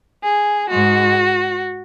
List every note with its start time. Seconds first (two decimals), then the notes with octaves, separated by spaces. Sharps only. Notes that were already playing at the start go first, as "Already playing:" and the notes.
0.22 G#4
0.69 G#2 G#3 F#4